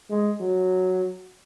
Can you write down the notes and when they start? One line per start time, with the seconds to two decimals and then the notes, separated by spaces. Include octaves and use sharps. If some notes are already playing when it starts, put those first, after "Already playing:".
0.10 G#3
0.40 F#3